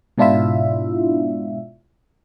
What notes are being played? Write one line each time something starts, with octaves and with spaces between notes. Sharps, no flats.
G#2 B2 D4 E4 F4 E5